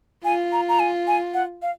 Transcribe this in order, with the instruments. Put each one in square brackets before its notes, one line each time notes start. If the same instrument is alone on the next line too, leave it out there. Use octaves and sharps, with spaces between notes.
[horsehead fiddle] F4 [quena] G#5
[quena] A#5
A#5
G#5
G#5
F#5
F5